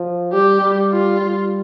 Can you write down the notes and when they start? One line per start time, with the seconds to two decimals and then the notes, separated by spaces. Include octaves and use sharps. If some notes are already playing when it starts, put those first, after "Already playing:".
Already playing: F3
0.32 G3 G4
0.62 G3
0.92 F4
1.21 G3